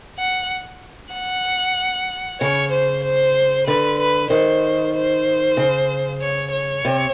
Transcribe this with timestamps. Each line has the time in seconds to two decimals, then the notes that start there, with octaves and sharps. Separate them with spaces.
0.18 F#5
1.13 F#5
2.40 C#3 C#5
2.72 C5
3.04 C5
3.67 D3 B4
3.99 B4
4.30 D#3 C5
4.94 C5
5.57 C#3
6.21 C#5
6.52 C#5
6.85 C3